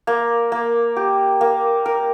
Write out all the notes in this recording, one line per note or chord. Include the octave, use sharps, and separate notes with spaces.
A#3
A#3
G4
A#3
A#4